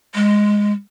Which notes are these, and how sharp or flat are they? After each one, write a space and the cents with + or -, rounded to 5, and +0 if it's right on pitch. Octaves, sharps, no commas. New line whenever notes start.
G#3 -5